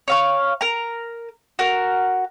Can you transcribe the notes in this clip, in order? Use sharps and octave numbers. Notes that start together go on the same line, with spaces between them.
C#5 F5 C#6
A#4 A#5
F#4 A#4